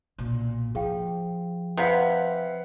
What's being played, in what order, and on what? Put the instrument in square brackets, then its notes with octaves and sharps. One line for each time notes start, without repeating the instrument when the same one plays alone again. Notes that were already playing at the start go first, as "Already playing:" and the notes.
[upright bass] B1 A#2
[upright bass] F3 [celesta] G#4 F5 G5
[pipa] C3 [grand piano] B4 F5 F#5 [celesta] F#6 B6